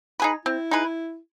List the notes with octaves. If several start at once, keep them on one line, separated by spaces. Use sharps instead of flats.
D#4 G#4 B4
C4 E4
D#4 G#4 B4